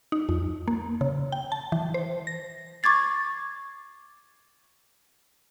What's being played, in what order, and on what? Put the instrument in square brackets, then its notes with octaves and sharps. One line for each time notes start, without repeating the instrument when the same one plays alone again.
[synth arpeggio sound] D#4
F2
A#3
C#3
G5
A5
E3
C5
A#6
[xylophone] C#6 D6 G#6 A6 C7